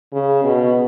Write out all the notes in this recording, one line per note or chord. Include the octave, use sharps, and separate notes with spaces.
C#3
B2